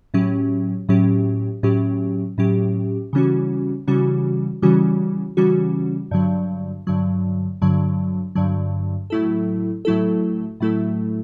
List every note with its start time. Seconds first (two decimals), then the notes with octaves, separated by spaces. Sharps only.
0.14 A2 F#3 C#4 G4
0.89 A2 F#3 C#4 G4
1.63 A2 F#3 C#4 G4
2.38 A2 F#3 C#4 G4
3.13 C#3 E3 G3 C#4 F#4
3.87 C#3 E3 G3 C#4 F#4
4.62 C#3 E3 G3 C#4 F#4
5.37 C#3 E3 G3 C#4 F#4
6.11 G2 D3 F#3
6.87 G2 D3 F#3
7.62 G2 D3 F#3
8.35 G2 D3 F#3
9.10 A2 F#3 A3 E4 A4
9.85 A2 F#3 A3 E4 A4
10.60 A2 F#3 A3 E4 A4